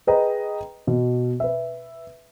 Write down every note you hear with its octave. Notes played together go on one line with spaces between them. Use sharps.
G#4 B4 D#5 G5 A#5
B2
B4 E5